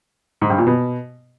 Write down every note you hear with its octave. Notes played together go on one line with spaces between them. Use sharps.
G#2
G2
A#2
B2